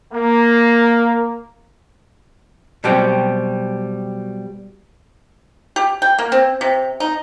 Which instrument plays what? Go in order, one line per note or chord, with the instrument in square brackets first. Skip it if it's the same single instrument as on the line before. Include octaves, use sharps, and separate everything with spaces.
[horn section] A#3
[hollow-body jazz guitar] B2 F#3 G3 B3 C4 G4
[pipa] G4
G5
A#3
C4
C3
D#4